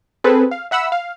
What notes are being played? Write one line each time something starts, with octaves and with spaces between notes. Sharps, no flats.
C4 G#4 A4 B4
F5
E5 F#5 B5 E6
F5